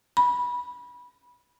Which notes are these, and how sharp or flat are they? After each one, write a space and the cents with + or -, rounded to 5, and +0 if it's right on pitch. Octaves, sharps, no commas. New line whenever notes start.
B5 -15